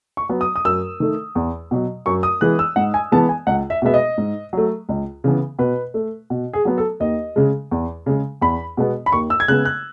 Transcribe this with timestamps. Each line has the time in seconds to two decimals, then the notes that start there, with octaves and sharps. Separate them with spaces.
0.17 C#6
0.29 F#3 B3
0.41 D#6
0.56 D#6
0.65 F#2 E6
1.00 D#3 A3
1.35 E2
1.71 B2 F#3
2.06 F#2 C#6
2.23 D#6
2.41 E3 G#3 B3 F#6
2.59 E6
2.76 G#2 F#5
2.94 G#5
3.12 E3 G#3 B3 A5
3.29 G#5
3.47 C#2 F#5
3.70 E5
3.82 B2 G#3 B3 E5
3.94 D#5
4.18 G#2
4.53 F#3 A3
4.89 C#2
5.24 C#3 E3 B3
5.59 B2 B4
5.94 A3
6.30 B2
6.53 G#4
6.65 F#3 B3
6.78 A4
7.00 D#2 D#5
7.36 C#3 G#3
7.71 E2
8.06 C#3 G#3
8.41 E2 B5
8.77 B2 G#3 B3
9.06 B5
9.12 D#2 C#6
9.30 E6
9.40 G#6
9.48 C#3 G#3 B3 F#6
9.65 F#6